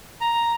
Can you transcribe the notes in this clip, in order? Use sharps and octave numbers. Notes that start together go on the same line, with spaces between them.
A#5